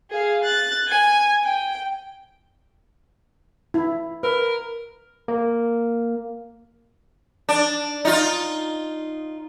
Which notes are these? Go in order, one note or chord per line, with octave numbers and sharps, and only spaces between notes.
G#4 F5
F#6 A6
G#5
G5
E4
A#4 B4
A#3
D4
D#4 F4